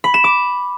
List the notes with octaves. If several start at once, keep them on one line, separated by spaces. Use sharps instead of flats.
B5
E7
D6